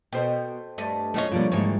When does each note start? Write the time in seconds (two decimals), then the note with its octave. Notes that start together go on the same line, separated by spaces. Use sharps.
0.12 B2 A4 C5 G5
0.78 G2 A3 D#5
1.14 F#2 A3 D4 F4 G4 C#5 D#5
1.31 B2 D3 F3 G3 A#3
1.52 G#2 D3 E3 G3 G#3 A#3 C#5